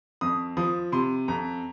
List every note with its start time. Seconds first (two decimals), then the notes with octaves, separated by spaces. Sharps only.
0.21 F2 D#6
0.57 F3 D#6
0.92 C3 C6
1.28 F2 A#5